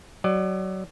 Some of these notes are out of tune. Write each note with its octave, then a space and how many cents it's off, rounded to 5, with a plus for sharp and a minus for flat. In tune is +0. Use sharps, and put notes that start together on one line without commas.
F#3 +25 D5 +35